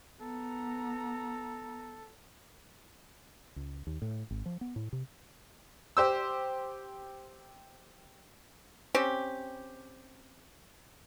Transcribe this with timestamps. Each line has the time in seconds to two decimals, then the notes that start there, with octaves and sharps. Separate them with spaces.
0.21 B3 A4 A#5
3.56 C#2
3.87 D#2
4.02 A2
4.31 G#1
4.46 F3
4.61 B3
4.76 A2
4.93 C3
5.97 G4 C5 E6
8.95 C4 C#4 G4